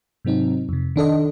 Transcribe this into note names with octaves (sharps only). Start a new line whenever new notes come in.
G#2 C3 F#3 C4 D#4
F2 C3
D#3 D4 A4 D#5